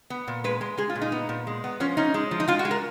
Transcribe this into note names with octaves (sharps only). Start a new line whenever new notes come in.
B3
A#2
G#3 B4
G#3
G#3 G#4
F4
A#2
D#4
B3
A#2
G#3
B3
F3 C#4
C#4 D#4
G#3
F3
D#4
G#3 F4
F#4
G#3
A#4